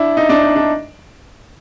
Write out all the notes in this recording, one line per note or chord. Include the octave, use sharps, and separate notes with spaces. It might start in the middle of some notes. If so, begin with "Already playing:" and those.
Already playing: D4 E4
D#4
D4
D#4
D4